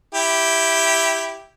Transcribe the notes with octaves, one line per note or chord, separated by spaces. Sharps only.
E4 G4